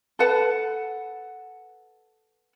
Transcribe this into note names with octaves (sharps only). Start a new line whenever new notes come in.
A4 B4 F#5 A5